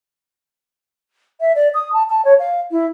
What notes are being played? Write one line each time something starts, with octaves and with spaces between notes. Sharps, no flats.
E5
D5
D#6
A5
A5
C#5
F5
E4